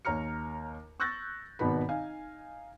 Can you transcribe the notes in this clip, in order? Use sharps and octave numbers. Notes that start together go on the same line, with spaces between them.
D#2 C#5 A#5 F6 C#7
C#6 E6 F#6 G6 A6 A#6
G#1 B2 D#3 B3 B5
D#4 F5 G#5